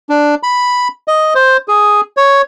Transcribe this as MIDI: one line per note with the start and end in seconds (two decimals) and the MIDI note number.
0.09 0.35 62
0.43 0.88 83
1.08 1.34 75
1.35 1.57 72
1.68 2.01 68
2.17 2.42 73